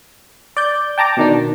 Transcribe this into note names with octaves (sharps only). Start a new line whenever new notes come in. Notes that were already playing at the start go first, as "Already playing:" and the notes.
D5 G6
G5 A5 A#5 D6
B2 D#3 D4